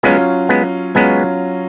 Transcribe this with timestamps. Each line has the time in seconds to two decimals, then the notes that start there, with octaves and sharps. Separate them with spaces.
0.03 F#3 G#3 B3 C#4 F4
0.49 G#3 B3
0.95 F#3 G#3 B3 C#4 F4